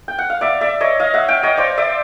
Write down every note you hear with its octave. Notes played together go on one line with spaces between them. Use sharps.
G5
F#5
F5
D5 E5
D5 E5
C#5 D#5
D#5 F5
E5 F#5
F5 G5
C#5 D#5
C5 D5
D5 E5